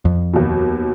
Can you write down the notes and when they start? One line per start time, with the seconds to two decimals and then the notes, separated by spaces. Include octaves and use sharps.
0.05 F2
0.33 D#2 B2